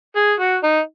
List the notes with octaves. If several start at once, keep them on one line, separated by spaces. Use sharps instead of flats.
G#4
F#4
D#4